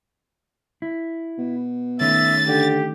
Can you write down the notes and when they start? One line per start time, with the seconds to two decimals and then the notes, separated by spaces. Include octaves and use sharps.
0.82 E4
1.38 B2
2.00 D#3 A3 C#4 E5 A6
2.48 D3 G4